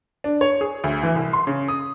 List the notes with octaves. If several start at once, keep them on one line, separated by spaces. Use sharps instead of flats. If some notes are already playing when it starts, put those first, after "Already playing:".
D4
C#5
G#4
D2
E3
C2
C6
C#3
D#6